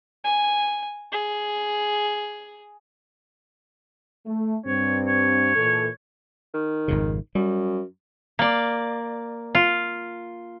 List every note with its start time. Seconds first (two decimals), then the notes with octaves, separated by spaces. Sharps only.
0.24 G#5
1.12 G#4
4.26 A3
4.66 G2 C4 C#5
5.07 C#5
5.56 A#2 E3 A4
6.54 D#3
6.88 G#1 F2 C#3
7.35 F#2 G3
8.39 A#3 D5
9.55 F4